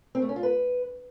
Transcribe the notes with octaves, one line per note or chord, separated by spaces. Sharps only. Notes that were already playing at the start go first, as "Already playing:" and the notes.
C4
A3
C#4
F4
B4